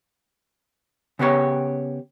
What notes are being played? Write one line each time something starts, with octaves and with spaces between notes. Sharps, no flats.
C#3 B3 G4 C#5